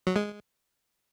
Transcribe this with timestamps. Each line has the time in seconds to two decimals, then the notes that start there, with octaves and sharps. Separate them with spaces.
0.07 F#3
0.16 G#3